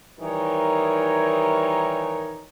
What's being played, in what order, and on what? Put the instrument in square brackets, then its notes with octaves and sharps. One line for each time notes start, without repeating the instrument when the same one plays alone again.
[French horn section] D#3 E3 G3 D#4 A#4 C#5